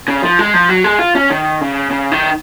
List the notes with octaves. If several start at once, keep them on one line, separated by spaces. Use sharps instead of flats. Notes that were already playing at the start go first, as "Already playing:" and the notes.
C#3
F3
G#3
F3
F#3
G#3
F4
C#4
D#3
C#3
C#3
D#3